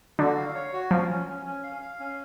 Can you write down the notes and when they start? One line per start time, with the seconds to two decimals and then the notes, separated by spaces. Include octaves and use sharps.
0.19 D3 F#4
0.37 F5
0.54 C#5
0.73 F#4
0.91 F3 C#4
1.10 C#4
1.28 C#4
1.46 C#4
1.64 F5
1.82 F5
2.00 C#4